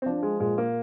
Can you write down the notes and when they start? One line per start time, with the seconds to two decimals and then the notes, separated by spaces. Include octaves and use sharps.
0.02 C4
0.06 F3 D4
0.23 G#3
0.40 A#2 G#3
0.58 A#3